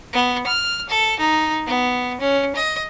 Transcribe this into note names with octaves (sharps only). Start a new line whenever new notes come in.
B3
F6
A4
D#4
B3
C#4
D#5